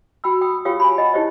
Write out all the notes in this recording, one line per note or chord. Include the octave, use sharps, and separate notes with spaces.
F#4 G5 B5 E6
G5 D#6
F4 G4 C#5 F5 G5 D#6
G#5 B5
D#5 F#5
D#4 E4 G4 C5 C#5 D#5